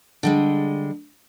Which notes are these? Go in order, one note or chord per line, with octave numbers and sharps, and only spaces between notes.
D3 G3 G#3